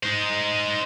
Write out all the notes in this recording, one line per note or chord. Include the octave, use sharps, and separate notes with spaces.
D#4 C5